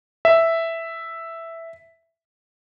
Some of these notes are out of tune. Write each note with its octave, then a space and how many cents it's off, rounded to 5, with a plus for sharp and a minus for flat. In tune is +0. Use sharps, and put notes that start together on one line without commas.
E5 +0